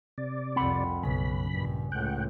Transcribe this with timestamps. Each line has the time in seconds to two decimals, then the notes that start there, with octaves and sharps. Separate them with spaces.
0.18 C3 D5
0.56 C2 F2 C4 F#5 B5
1.03 B1 F#2 C#3 B5
1.54 A#1 G2
1.92 C#2 A2 F#5 G5